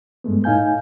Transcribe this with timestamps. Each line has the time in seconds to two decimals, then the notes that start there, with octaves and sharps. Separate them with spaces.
0.24 G2 G#3 A3 B3
0.44 A2 D#4 F5 G#5 G6